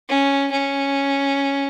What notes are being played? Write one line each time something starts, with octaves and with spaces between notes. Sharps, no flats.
C#4
C#4